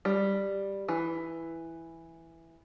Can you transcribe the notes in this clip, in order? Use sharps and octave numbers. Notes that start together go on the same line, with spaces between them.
G3
E3